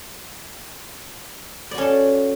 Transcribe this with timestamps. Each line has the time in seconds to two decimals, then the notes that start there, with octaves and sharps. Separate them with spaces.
1.71 D5
1.75 F#4
1.78 C#4
1.81 A4